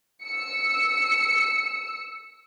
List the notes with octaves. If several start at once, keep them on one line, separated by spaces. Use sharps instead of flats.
E6 C#7